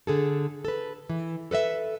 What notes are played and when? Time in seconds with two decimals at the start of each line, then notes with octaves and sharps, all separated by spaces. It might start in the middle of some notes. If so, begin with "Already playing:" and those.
0.07 D3 G#4 A4
0.65 A4 B4
1.09 E3
1.51 A4 B4 D#5 E5